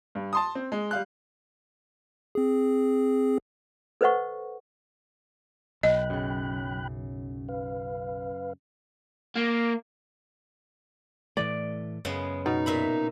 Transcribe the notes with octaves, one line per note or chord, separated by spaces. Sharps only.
G2
A5 C6 D#6
C4
G#3
G3 F5 F#6
C4 G#4
A4 B4 C5 D#5 F#5 C#6
B1 D#5 G5 B5 F#6
F#2 C#3
B4 F5
A#3
A2 E3 A3 D5
F#2 C#3 G#3 B3
B2 D#4
A#2 E5 B5